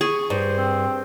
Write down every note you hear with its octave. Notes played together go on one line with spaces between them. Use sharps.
G#4 C#6
G2 C5
C4